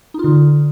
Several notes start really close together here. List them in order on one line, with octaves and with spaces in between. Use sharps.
D#4 F4 D3